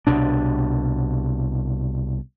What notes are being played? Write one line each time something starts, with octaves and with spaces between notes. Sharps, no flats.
C2 B2 D4